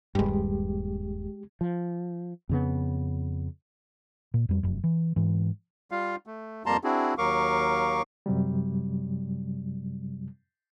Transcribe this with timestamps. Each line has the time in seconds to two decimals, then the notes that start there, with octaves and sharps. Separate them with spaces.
0.15 D#1 G2 G#3 G4
1.61 F3
2.49 F2 C#3 B3
4.34 A#2
4.49 F2 G3
4.63 F1 F#2
4.84 E3
5.16 G#2 E3
5.91 G3 F4 F5
6.27 A3
6.66 F2 G3 A#3 A5 A#5 C6
6.84 C4 D4 E4 F#4 G#4
7.18 D#2 F#3 A#4 F5 C#6 D6
8.26 F#2 C3 F#3 G3